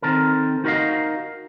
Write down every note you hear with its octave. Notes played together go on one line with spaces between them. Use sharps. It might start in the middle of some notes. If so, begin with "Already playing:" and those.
D#3 C4 A4 A#4
D#4 F#4 A#4 B4 D#5 F5